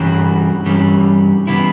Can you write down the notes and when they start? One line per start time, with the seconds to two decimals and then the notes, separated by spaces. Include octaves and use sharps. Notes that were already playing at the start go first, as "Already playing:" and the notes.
Already playing: G2 E3 G3 C#4 F#4
0.66 G2 E3 G3 C#4
1.47 C#3 E3 G3 B3 E4